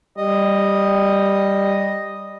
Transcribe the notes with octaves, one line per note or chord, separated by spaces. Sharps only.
G3 D#5